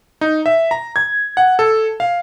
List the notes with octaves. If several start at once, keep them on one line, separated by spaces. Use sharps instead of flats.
D#4
E5
A#5
G#6
F#5
A4
F5